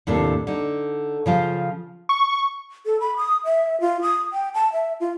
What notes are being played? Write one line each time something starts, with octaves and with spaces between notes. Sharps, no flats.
D#2 A2 C3 D4
D3 D#4
C#3 F3 F4 C5
C#6
A4
B5
D#6
E5
F4
D#6
G5
A5
E5
F4